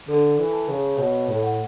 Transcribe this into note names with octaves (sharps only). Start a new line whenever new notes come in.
D3 A4
E3
A5
C#3
B2 C#5
A2
F#5